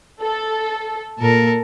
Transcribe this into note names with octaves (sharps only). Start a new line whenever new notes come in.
A4
A#2 A4 A#4